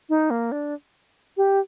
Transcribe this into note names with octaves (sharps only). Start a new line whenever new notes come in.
D#4
A#3
D4
G4